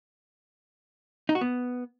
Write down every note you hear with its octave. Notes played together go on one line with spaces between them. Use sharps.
D#4
F#4
B3